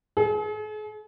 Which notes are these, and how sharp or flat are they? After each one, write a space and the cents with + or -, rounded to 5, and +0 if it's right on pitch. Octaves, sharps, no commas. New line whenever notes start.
G#4 +45